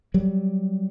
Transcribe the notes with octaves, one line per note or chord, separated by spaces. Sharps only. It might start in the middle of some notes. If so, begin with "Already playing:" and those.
F#3 G3